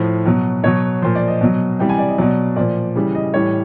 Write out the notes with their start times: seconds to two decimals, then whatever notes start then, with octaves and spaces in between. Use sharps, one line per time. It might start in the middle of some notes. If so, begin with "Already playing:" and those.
Already playing: A2 F3
0.25 B2 F#3
0.63 B2 F#3 C#5
1.02 A#2 F3 C5
1.15 D5
1.28 D#5
1.41 B2 F#3
1.79 C3 E3 G3 G5
1.89 G#5
1.99 D5
2.08 D#5
2.18 B2 F#3 D5
2.56 A#2 F3 D5
2.95 C#3 E3 G3
3.15 D#5
3.34 A2 E3 G3 C#5